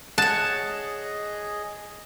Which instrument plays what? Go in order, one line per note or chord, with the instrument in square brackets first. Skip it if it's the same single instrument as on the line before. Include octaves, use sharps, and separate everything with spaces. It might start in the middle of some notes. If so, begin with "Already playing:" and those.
[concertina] G#4 D#5 [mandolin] C#5 F#5 [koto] A5